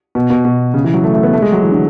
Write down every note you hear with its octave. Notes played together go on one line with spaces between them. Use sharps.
B2
B2
B2
C#3
E3
F#3
A3
A3
B3
A3
G#3
F#3
E3
D3